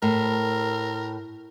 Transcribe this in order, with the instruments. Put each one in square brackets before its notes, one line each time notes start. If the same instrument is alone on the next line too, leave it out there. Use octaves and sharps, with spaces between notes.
[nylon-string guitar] A2 [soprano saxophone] A#4